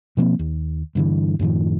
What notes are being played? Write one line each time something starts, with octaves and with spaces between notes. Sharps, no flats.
B2 F3 A#3 C4
D#2
G2 D3 E3
F#2 A2 D#3 F3